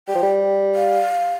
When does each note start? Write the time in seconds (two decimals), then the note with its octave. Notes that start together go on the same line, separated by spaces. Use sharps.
0.08 G3 G5
0.15 F3
0.23 G3
0.75 F5